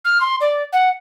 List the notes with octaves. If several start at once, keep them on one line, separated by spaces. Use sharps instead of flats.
F6
C6
D5
F#5